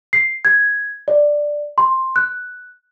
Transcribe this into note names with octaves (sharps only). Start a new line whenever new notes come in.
C7
G#6
D5
C6
F#6